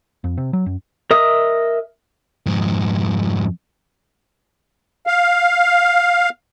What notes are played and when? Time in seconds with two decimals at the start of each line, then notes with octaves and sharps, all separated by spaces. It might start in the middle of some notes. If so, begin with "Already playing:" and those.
0.24 F2
0.38 C3
0.53 F#3
0.66 F#2
1.11 A#4 D#5 E5 D#6
2.46 F2 G#2
5.07 F5